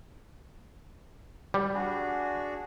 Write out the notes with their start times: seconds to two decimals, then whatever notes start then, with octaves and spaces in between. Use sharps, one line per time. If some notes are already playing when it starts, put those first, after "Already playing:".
1.54 G3
1.74 D4 F#4 G#4